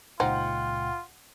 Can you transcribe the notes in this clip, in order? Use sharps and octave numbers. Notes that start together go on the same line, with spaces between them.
C#2 A#2 D#4 F4 C5 F#5 G5